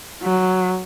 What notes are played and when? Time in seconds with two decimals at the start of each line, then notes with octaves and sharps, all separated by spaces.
0.23 F#3